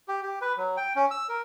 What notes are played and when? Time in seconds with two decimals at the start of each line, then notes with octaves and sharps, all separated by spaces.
0.08 G4
0.23 G4
0.41 B4
0.57 F#3
0.77 G5
0.96 C#4
1.11 E6
1.29 A#4